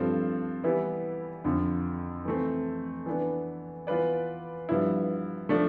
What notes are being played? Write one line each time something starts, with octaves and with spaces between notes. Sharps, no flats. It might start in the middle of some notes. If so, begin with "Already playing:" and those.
Already playing: G2 F3 C4 F4 A4
E3 G3 B3 E4
F2 D3 F3
E3 A3 C4
E3 B3 D4
E3 B3 F4 B4 D5
G2 F3 B3 E4
F3 A3 D4